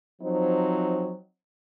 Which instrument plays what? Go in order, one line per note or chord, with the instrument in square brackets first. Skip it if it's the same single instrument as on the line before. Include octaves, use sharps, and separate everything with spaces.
[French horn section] F3 F#3 C4 D#4